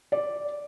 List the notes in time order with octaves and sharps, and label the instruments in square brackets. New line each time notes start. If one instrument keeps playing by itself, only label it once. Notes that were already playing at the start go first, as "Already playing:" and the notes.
[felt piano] D5